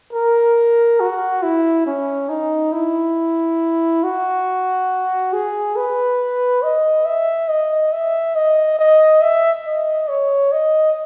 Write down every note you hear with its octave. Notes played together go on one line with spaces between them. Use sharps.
A#4
F#4
E4
C#4
D#4
E4
F#4
G#4
B4
D#5
E5
D#5
E5
D#5
D#5
E5
D#5
C#5
D#5